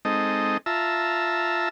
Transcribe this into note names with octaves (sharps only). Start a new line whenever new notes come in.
G#3 C4 D#4 A4 D#5
F4 E5 A5 A#5 E6